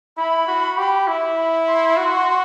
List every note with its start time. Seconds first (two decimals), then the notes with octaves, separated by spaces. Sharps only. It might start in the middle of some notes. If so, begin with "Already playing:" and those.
0.17 E4 B5
0.47 F#4
0.77 G4
1.07 E4
1.37 B5
1.67 C6
1.97 F#4